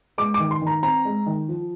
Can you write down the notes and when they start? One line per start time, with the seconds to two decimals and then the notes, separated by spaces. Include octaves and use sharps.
0.18 G#3 D6
0.34 D6
0.40 D#3
0.51 C6
0.62 D#3 A#5
0.83 C4 A#5
1.05 G#3
1.26 D#3
1.49 F3